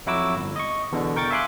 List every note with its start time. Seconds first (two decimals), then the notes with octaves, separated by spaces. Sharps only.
0.06 F2 F#3 E4 F#4 D6 E6
0.36 G1
0.56 D#5 C#6
0.92 E2 B2 D3
1.16 A#4 G5 C#6 G6 A6
1.31 E5 F5 G#5 C6 D6 F#6